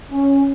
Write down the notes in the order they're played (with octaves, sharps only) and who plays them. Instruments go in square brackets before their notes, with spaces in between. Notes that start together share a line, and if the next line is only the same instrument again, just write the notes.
[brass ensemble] C#4